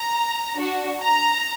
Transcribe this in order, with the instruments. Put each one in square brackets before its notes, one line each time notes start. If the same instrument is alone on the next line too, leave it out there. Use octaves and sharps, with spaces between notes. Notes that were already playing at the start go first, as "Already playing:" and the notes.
Already playing: [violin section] A#5
D4 F#4
A#5